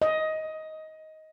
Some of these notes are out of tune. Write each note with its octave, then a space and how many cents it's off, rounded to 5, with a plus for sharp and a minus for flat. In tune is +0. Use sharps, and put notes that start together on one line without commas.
D#5 +15